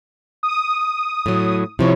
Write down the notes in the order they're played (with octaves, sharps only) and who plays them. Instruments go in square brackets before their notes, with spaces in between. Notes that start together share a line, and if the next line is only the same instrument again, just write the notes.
[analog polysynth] D#6
[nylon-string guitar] A2 F#3
[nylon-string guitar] C3 F3 C4 [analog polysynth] E4 C#5